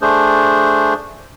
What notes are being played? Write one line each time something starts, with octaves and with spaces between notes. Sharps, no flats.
A3 D4 G#4 C5